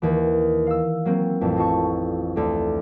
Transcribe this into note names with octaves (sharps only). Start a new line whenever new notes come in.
D#2 E3
F5 E6
F#3 A#3 C4
A1 F2
D#4 F4 A5 C#6
D2 D3